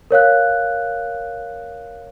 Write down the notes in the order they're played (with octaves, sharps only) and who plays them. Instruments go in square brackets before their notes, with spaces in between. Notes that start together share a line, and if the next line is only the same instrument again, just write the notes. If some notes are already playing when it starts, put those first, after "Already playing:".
[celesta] A#4 C#5 F5 F#6